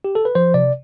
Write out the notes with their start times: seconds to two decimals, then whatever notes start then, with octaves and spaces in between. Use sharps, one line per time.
0.04 G4
0.15 A4
0.25 B4
0.35 F3 C5
0.54 C3 D5